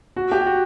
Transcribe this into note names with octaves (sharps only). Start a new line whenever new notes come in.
F#4
G4
F#4